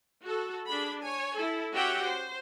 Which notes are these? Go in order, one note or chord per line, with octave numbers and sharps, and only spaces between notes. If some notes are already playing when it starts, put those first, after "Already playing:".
F#4 A4
D4 G#4 B5
C#5 G#5
E4 A4
C#4 F#4 G4 E5 F#5 G5
C5